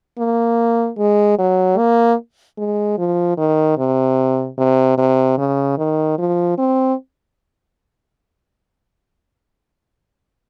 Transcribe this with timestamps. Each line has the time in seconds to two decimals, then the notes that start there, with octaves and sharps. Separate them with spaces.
0.18 A#3
0.98 G#3
1.39 F#3
1.78 A#3
2.58 G#3
2.98 F3
3.38 D#3
3.78 C3
4.58 C3
4.98 C3
5.38 C#3
5.78 D#3
6.18 F3
6.58 C4